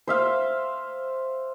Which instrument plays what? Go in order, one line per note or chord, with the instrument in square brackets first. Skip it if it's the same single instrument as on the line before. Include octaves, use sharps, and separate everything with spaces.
[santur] C5 E5 F5